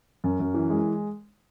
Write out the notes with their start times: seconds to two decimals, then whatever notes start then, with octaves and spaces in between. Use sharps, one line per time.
0.24 F#2
0.40 F#2
0.54 E3
0.70 G#3